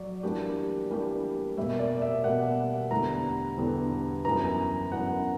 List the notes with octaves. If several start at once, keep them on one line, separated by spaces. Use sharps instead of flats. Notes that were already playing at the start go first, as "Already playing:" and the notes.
Already playing: F#3 D5
E3 G3 A#3 D4 G4
E3 G3 A#3 D4 G4
B2 G3 A#3 E5
D5
E5
B2 G3 A#3 F#5
E2 D3 G3 B3 E4 A#5
E2 D3 G3 B3 E4
F#2 E3 B3 A#5
F#2 E3 B3 F#5